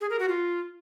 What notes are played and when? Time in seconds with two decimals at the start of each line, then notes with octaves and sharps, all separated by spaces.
0.01 G#4
0.10 A#4
0.19 F#4
0.29 F4